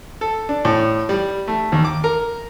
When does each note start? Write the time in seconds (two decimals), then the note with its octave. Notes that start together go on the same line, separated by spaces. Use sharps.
0.21 A4
0.49 D4
0.65 A2
1.09 G3
1.48 A3
1.72 D#2
1.85 D6
2.04 A#4